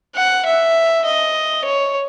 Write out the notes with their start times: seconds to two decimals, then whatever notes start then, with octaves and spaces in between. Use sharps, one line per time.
0.16 F#5
0.45 E5
1.05 D#5
1.65 C#5